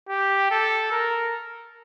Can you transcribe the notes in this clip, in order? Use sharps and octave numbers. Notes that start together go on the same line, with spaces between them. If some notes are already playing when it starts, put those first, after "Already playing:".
G4
A4
A#4